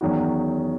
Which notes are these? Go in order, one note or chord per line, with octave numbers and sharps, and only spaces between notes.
E2 D#3 F#3 C#4 F#4